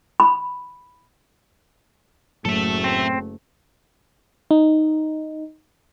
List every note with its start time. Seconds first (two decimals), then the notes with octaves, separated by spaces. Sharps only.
0.20 B5
2.45 F#1 A2 F#3 A3 A4 E5
2.84 C4
4.51 D#4